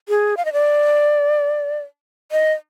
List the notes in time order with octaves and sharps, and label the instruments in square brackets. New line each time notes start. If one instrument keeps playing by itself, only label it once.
[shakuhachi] G#4
F5
D#5
D5
D#5